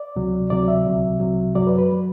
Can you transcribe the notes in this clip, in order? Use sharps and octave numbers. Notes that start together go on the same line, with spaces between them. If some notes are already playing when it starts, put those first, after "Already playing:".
Already playing: D5
D2 C3 F#3
D2 C3 F#3 D5
E5
C2 C3 F#3
C2 C3 F#3
F#2 F#3 D5
B4
B4
F#3